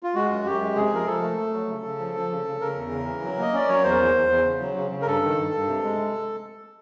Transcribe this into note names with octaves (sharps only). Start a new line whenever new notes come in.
F4
G#3 F#4
F#2
F#2 G4
G#3
C3 G#4
F3 A#4
F3 A4
A3
A3
F#3
C#3
C#3
F3
F3
C#3
C#3
C#3 A#4
E2
C#3
E3
F#3
A#3 D#5
C#4 D5
F#3 C#5
E2 C5
E2
E2
E2
C#3
F#3
C#3
C#3
A#4
G2 A4
D#3
G2
G2
C3
G#3